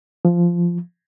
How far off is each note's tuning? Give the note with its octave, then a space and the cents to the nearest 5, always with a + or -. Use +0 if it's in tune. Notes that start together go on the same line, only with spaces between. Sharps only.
F3 -10